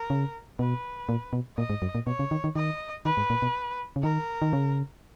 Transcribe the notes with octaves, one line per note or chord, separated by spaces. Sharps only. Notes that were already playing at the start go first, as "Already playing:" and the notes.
Already playing: A#4
C#3
B2 B4
A#2
B2
A#2 D#5
G#2
F#2
A#2
B2 C#5
C#3
D#3
D#3
D#3 D#5
D#3 B4
G#2
A#2
B2
C#3
D#3 A#4
D#3
C#3